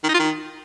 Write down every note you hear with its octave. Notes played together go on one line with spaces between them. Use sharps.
D#3
D#4
F4
D#3